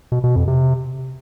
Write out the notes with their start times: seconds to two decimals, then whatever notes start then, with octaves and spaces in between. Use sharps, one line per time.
0.12 B2
0.24 B2
0.36 F2
0.48 C3